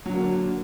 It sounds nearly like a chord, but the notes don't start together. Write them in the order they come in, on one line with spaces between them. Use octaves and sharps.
F#3 D3 A#3